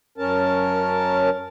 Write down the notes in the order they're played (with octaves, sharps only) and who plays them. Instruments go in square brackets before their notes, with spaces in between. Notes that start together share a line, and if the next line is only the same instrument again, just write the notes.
[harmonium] F#2 C#4 A#4 A5